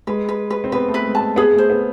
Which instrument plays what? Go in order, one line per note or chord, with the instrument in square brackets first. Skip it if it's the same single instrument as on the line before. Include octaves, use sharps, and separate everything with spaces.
[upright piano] G#3 [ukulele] B4
[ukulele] B4
B4
[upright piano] C4
[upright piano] B3 [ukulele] B4
[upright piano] A3
[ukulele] B4
[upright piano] G#3
[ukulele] A5
[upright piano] A3
[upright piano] B3 [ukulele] G#4
[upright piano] A3
[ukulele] C5
[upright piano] B3